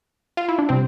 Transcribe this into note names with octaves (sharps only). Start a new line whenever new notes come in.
F4
E4
D4
C3 G3 C4